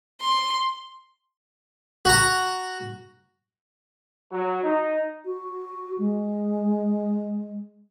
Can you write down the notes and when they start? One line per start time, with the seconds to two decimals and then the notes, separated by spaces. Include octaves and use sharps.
0.21 C6
2.05 F#4 A#5
4.32 F#3
4.64 D#4
5.25 F#4
5.98 G#3